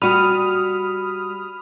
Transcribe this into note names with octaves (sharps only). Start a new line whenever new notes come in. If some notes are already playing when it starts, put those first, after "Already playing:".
G3 F#4 B5 D#6 F6